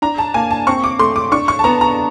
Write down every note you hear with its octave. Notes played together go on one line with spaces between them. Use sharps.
D4 A#5
A5
A#3 G#5
A5
C4 C#6
D6
A3 C6
D6
D4 C#6
C#6
A5
B3 A#5
A#5